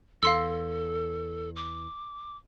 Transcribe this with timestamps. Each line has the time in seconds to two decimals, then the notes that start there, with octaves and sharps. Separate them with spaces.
0.23 E2 A4 F5 C6 E6
1.56 D6